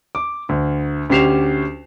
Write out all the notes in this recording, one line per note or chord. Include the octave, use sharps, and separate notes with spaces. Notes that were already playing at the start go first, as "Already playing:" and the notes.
D6
D2
D2 C#4 G4 C7 E7 F7